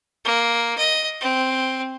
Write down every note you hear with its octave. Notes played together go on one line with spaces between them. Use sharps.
A#3
D#5
C4